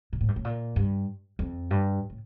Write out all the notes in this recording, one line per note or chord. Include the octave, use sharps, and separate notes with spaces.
A#2
A2
G2
A2
A#2
G2
F2
G2
A2